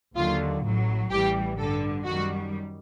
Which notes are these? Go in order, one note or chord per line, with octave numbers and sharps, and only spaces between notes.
D#2 D3 F#3 F4
A1 A2 F#3
A1 A2 E3 G3 G4
G2 D3 G3 A4
F#2 D#3 G3 F#4